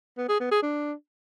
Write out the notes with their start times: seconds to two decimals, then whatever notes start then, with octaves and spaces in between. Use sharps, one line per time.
0.18 B3
0.29 G#4
0.40 B3
0.51 G#4
0.62 D4